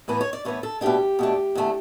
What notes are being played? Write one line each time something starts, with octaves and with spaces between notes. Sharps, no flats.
A2 E3 B3 B4
C#5
D5
A2 E3 B3 C#5
A4
B2 A3 D4 G4
B2 A3 D4
E2 D3 A3